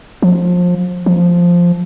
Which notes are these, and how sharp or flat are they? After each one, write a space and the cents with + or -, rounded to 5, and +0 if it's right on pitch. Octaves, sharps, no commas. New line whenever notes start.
F3 +25
F3 +0